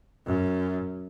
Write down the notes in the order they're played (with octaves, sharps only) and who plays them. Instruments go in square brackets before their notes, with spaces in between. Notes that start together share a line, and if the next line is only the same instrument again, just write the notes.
[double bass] F#2